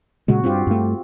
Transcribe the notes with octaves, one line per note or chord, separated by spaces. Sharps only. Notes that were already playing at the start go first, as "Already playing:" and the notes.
A#2 C#3 G#3 F#4
G2 C4 F4 G4
G2 A3